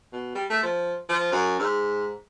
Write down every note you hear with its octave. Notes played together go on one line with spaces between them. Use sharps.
B2
G3
A3
F3
F3
F#2
G#2